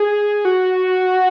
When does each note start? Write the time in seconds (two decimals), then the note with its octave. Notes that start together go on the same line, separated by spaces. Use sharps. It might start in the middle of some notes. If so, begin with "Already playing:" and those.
Already playing: G#4
0.45 F#4